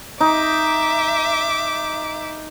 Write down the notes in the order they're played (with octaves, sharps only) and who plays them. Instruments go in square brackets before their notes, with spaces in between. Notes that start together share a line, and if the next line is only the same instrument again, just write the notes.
[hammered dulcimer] D#4 [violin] E5 D6